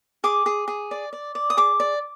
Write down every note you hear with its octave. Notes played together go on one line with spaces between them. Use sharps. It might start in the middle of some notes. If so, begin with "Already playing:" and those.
G#4 D6
G#4
G#4
D5
D5
D5
D#6
G#4 D6
D5